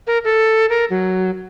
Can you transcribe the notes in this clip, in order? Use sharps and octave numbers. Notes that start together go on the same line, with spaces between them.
A#4
A4
A#4
F#3